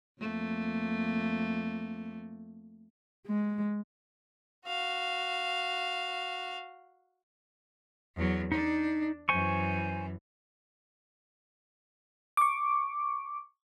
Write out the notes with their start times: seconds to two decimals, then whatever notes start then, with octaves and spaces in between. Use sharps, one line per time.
0.20 F2 A3 A#3
3.27 G#3
4.65 F#4 F5
8.17 E2 F#3
8.52 D4 D#4
9.29 F#2 E3 C5 G#5 C#6
12.37 C#6 D6